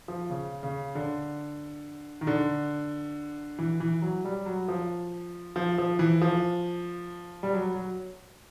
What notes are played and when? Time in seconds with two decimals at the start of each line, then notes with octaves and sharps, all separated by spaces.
0.08 F3
0.30 C#3
0.63 C#3
0.95 D3
2.21 D#3
2.27 D3
3.59 E3
3.80 E3
4.02 F#3
4.25 G3
4.46 F#3
4.68 F3
5.56 F3
5.78 F3
5.99 E3
6.21 F3
7.43 G3
7.54 F#3
7.74 F#3